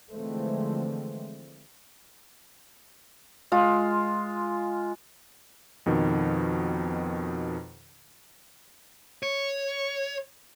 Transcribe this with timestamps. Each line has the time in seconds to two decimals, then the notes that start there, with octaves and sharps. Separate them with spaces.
0.12 D3 E3 F3 G#3 A3 C4
3.52 G#3 F4
5.86 F2 B2 D#3
9.23 C#5